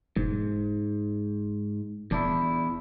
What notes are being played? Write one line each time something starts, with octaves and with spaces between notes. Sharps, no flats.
E1 G#2
D#1 E2 D4 E4